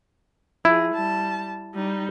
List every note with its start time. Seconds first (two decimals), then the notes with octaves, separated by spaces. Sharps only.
0.65 F3 E4 G#4
0.94 G3 A5
1.75 G3 D#4